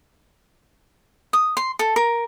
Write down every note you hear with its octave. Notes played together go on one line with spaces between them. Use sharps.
D#6
C6
A4
A#4